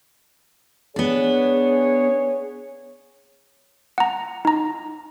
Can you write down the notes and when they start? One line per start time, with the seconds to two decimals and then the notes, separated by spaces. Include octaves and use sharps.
0.96 B3 D4 G#4 C#5
3.98 F#5 A#5
4.45 D#4 A#5